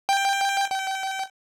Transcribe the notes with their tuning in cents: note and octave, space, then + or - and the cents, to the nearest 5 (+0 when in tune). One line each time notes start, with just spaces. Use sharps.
G5 +10
G5 -30